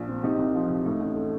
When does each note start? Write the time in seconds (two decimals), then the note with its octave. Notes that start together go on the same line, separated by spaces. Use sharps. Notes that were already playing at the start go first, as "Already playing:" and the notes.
Already playing: A#1 D4 F4
0.09 C4
0.23 C3 D#4 G4
0.38 C2
0.55 F3
0.70 C2
0.85 A2 D#4
1.00 A1
1.16 A3